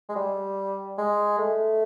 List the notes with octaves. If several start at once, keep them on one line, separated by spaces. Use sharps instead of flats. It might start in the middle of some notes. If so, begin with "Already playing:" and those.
G#3
G3
G#3
A3